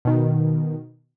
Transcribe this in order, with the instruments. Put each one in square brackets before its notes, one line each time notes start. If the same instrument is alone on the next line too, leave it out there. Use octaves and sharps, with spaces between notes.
[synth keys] B2 D#3